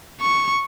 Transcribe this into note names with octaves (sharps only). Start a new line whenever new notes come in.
C#6